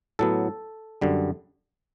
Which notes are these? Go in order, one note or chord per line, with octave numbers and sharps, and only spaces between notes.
A2 F#3 B3 A4
F#2 D3 G3